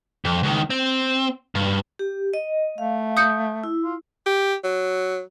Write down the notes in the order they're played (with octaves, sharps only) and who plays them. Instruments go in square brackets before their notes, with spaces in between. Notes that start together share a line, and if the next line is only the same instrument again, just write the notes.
[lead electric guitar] F2
C#2 D#3
C4
G2
[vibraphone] G4
D#5
[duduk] A3 [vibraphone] F5
[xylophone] D#6 G6 C#7
[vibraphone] E4
[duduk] F4
[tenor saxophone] G4
F#3